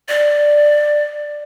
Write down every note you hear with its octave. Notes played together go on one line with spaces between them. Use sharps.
D5